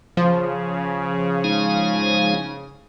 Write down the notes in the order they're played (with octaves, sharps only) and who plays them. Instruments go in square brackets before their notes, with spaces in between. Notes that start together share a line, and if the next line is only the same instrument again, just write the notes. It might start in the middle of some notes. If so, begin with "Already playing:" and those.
[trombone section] C#3 [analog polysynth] F3
[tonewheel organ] G#3 D#4 F5